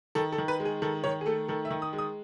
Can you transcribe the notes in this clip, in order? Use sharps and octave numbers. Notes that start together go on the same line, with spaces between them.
D#3 A4
A4
D#3
B4
G#3
G#4
D#3 A4
D#3 C#5
G#4
A3 A4
D#3 A4
E5
D#3
D#6
G#3
D#6